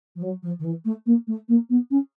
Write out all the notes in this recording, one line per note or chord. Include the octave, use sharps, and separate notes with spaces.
F3
F#3
F3
D#3
E3
A3
A#3
A3
A#3
B3
C#4